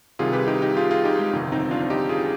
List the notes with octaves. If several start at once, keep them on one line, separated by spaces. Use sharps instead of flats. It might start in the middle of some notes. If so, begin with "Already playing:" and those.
C2 C3 D#3 F4 G#4
G4 B4
D#4 G4
D#4 G4
F4 G#4
F4 G#4
D#4 G4
G#3
G1 F2 C3 D#3
C4 D#4
D4 F4
D#4 G4
F4 G#4